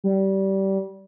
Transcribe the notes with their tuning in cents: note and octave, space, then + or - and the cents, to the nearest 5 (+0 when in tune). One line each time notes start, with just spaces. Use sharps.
G3 -20